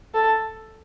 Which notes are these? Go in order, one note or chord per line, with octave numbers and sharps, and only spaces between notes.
A4